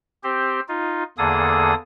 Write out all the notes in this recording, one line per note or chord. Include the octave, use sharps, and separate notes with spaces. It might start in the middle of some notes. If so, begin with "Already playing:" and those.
C4 G4 C5
D#4 F4
E2 D3 A#3 G#4 A4 D#6